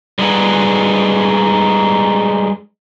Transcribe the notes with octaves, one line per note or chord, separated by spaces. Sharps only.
G3 G#3 D#4 G#4 B4 F#5